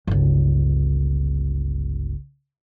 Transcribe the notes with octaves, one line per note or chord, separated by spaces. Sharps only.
G1 C#2